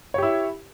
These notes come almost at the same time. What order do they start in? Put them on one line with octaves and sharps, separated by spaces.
C#5 G4 E4